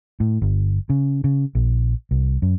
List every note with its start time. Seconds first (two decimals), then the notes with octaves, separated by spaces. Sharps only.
0.20 A2
0.42 G1
0.90 C#3
1.24 C#3
1.55 A#1
2.11 C2
2.42 F#2